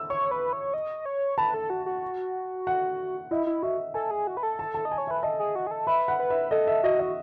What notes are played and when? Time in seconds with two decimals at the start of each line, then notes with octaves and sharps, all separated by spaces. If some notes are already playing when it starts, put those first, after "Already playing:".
Already playing: E6
0.10 C#5 C#6
0.31 B4
0.53 C#5
0.74 D#5
1.05 C#5
1.38 B4 A5
1.54 A4
1.70 F#4
1.86 F#4
2.67 F#5
3.31 E4 D#5
3.47 E4
3.63 F#4 E5
3.94 A4 G#5
4.11 G#4
4.27 F#4
4.37 B4
4.43 A4
4.59 A5
4.75 A5
4.85 D#5
4.91 G#5
4.98 C#5
5.07 B4 E5
5.23 A4 D#5
5.39 G#4
5.55 F#4
5.67 G#4
5.71 A4
5.87 B4 E5
6.08 F#5
6.20 B4
6.30 E5
6.51 A4 D#5
6.67 E5
6.83 F#4 D#5
7.00 D#5